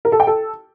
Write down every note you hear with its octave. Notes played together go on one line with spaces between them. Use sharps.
A#4
A4
G5
A4